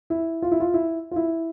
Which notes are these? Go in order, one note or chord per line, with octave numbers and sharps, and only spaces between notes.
E4
F4
E4
F4
E4
F4
E4